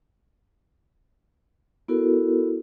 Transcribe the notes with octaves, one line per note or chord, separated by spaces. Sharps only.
B3 E4 F#4 A4 A#4